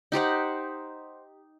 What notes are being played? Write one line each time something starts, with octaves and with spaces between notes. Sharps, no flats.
D#4 G4 C5 F#5